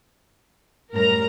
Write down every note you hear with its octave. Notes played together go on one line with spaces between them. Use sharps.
F#2 A2 G3 A#4 A#5